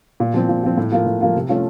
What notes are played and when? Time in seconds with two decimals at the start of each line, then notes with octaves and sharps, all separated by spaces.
0.20 A#2
0.34 F3 C4
0.49 A#2
0.63 F3 C4
0.78 A2
0.92 F3 A#3 F4
1.06 A2
1.21 F3 A#3 F4
1.35 C3
1.49 F3 A3 C#4 F4